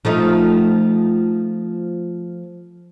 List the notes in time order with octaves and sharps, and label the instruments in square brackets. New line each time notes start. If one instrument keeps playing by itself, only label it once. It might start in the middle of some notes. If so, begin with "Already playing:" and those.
[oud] F3 A3 D#4